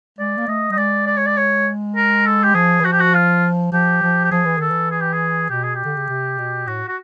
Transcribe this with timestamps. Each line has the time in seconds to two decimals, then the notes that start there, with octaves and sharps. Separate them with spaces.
0.19 G#3 D5
0.37 A#3
0.48 A3 D#5
0.70 G3 D#5
0.77 G#3 D5
1.07 D5
1.17 C#5
1.26 D5
1.37 C#5
1.96 A#4
2.26 A4
2.44 G4
2.54 F3 G#4
2.80 E3
2.84 F3 F#4
2.92 G4
3.00 F#4
3.14 F4
3.72 F3 G4
4.02 F3
4.24 G4
4.31 F3 G#4
4.45 E3
4.57 D#3 A4
4.71 E3
4.91 G#4
5.01 G4
5.13 G#4
5.50 B2 G4
5.63 G#4
5.75 G4
5.85 D3
5.96 C#3
6.09 C3
6.38 B2
6.67 A2 F#4
6.88 F#4